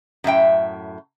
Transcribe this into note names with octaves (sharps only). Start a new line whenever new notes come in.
F#2 A2 E5 G5